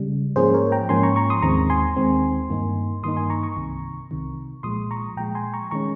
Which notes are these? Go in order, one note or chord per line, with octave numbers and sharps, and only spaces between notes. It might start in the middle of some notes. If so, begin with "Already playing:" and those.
Already playing: C#3 G3
G#2 F3 A#3 C#4 G#4 C5
A#4 C#5
G5 A#5
G#2 F3 A#3 C#4 G#5 C6
A#5 C#6
A#5 C#6
C6 D#6
D#2 D#3 G#3 C4 A#5 C#6
G#5 C6
D#2 D#3 G#3 C4
G2 D#3 A#3 D#4
G2 D#3 A#3 D#4 C6 D#6
G#5 C6
A#5 C#6
A#5 C#6
C2 C3 D#3
C2 C3 D#3
A#2 F3 G#3 C6 D#6
A#5 C#6
A#2 F3 G#3 G5 A#5
G#5 C6
A#5 C#6
D#3 G#3 C#4 A#5 C#6